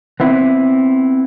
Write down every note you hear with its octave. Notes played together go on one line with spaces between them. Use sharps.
B3 C4 E4